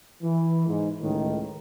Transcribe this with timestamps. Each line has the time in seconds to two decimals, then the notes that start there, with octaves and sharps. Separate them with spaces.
0.23 E3
0.67 G#2
1.00 C#2 A2 D#3